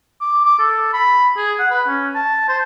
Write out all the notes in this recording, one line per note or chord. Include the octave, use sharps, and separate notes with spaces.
D6
D6
A4
B5
G#4
F#5
B4
C#4
A5
C5